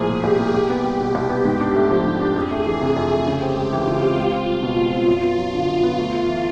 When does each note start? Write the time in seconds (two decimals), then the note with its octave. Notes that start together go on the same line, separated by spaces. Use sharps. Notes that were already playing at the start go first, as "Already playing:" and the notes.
Already playing: C2 A2 F3 A#3 G#4
0.09 A#2 G4
0.24 C2
0.39 A#3
0.54 C2 G4
0.70 B3
0.84 G3
1.00 B2
1.15 C2
1.29 B3
1.45 G#2
1.61 D4
1.76 A3
1.91 F3
2.06 G#2
2.21 D4
2.36 F2 G#4
2.51 A3
2.66 E3
2.81 C3
2.96 F2
3.11 A3
3.26 C#3 G4
3.42 C4
3.56 G#3
3.72 E3 F4
3.87 C#3
4.02 C4
4.17 C#2
4.32 C4
4.47 G3
4.63 B2 F4
4.78 C#2
4.93 C4
5.08 F#2
5.23 B3
5.38 F#3
5.53 D3
5.68 F#2
5.83 B3
5.98 D2
6.14 A3
6.29 E3